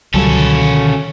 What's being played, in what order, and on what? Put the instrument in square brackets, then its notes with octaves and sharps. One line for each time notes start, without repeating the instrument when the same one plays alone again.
[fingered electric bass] C#2 F#3 G3 [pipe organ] B2 D3 D#3 [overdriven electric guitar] C#4 A4